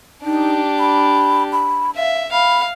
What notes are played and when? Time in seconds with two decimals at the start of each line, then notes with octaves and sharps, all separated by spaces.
0.25 D4 D#4 G4
0.79 B5
1.53 B5
1.96 E5 F5
2.32 F5 B5